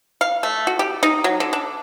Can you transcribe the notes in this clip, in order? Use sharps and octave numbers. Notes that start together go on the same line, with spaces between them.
F5
A3
F#4
G4
D#4
F#3
D3
D4